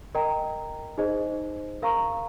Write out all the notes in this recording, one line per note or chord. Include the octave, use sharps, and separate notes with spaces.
A#4 D#5 G5 A#5
D#4 G#4 C5 D#5
A#4 F5 A#5 C#6